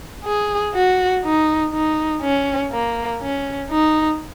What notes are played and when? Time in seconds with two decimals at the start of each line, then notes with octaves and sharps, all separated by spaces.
0.24 G#4
0.74 F#4
1.24 D#4
1.74 D#4
2.22 C#4
2.73 A#3
3.21 C#4
3.70 D#4